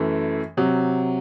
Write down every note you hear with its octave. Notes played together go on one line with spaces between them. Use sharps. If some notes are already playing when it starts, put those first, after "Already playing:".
Already playing: F#2 E3 A3
C3 F#3